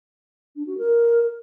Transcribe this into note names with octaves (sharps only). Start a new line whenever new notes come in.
D4
F#4
A#4